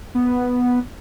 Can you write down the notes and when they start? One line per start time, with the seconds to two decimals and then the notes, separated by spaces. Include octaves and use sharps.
0.15 B3